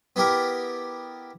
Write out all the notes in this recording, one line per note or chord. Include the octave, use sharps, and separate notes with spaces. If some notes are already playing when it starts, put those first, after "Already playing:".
B3 E4 G4 A#4